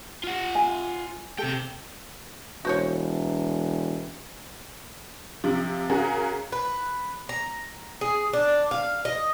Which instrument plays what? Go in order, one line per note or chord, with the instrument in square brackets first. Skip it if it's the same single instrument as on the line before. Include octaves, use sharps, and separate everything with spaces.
[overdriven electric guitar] F4 F#5
[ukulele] G#5
[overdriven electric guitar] C3 G5 [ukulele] A4
[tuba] E1 [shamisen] F#4 C5 C#5
[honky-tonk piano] C3 F3
C#3 F#4 G#4 A#4
[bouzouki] B4
A#5
G#4
D4
F5
D#5